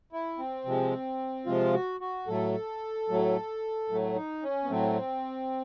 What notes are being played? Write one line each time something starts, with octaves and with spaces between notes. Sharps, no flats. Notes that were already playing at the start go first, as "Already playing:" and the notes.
E4
C4
C3 F3 G#3
C3 F3 G#3 F4
F#4
F#4
A2 F#3 A3 A4
A2 F#3 A3
A2 F#3 A3
D#4
C#4
B3
A2 F#3 A3 C4